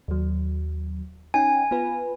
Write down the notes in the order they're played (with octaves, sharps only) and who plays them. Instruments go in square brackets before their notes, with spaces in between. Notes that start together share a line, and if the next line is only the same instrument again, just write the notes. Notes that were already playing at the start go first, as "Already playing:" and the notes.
[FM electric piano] D#2 F#3
[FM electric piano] C#4 D#4 G5 [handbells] G#5
[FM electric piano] B3 F4 B4